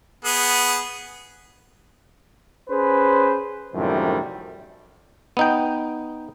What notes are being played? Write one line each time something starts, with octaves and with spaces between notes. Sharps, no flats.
B3 G#4
C#4 G#4 B4 C5
F#2 A2 C3 D#3 F3 G3
B3 D#4 G5